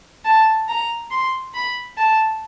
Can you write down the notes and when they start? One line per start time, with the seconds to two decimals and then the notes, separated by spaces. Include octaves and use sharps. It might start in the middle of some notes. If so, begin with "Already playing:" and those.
0.25 A5
0.68 A#5
1.11 C6
1.54 B5
1.97 A5